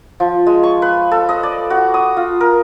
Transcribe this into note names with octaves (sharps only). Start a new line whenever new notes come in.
F3
G#3
C#6
B4
A4
D#5
D5
F#4
D#6
F4
A#4